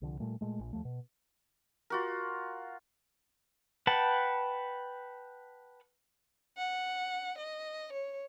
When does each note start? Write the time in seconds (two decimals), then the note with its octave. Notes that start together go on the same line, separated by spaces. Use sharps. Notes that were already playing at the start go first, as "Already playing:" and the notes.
0.02 C2 D3 F3
0.20 A#2 G3 A3
0.41 A#2 G#3 A3
0.59 A#1
0.73 D#2 F3 A3
0.85 B2
1.90 F4 F#4 A#4
3.87 B4 F#5 G5 A5
6.57 F#5
7.38 D#5
7.93 C#5